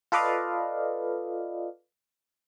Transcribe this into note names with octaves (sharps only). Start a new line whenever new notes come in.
F4 A4 B4 D5 D#5 F5